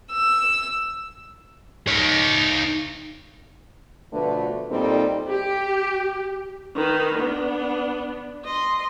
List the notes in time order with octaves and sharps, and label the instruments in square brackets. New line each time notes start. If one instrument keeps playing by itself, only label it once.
[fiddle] E6
[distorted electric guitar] D#4 C#5
[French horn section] B2 D3 F3 A3 B4
A#2 G3 C4 D#4 A4
[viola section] G4
[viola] D#3 B4
B3 D4
D#5 C6